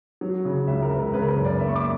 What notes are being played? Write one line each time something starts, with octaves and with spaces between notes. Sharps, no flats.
F#3
C#3
C#2 E5
A#4
C#2 B4
A#4
C#3 B4
A#4
B4
F#2
D5
A#3 E5
C#6
D6